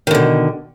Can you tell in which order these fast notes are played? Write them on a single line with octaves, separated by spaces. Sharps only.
D#3 D3 B2